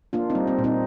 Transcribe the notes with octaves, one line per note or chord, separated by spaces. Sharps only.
A#3 D4 F4
C4 D#4
G3
C4
A#2
C4 D#4